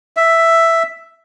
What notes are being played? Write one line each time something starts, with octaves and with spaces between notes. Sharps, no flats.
E5